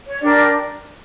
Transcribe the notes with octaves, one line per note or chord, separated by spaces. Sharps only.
C#5
D4 G4 A#4 D5